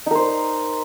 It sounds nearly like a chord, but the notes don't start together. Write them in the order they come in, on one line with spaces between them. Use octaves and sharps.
D#4 A#4 C5